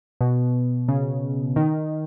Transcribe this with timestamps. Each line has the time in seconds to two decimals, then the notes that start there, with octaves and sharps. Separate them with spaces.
0.21 B2
0.88 C#3
1.56 D#3